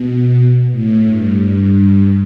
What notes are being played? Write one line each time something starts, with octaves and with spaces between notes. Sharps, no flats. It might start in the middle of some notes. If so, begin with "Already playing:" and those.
Already playing: B2
A2
G2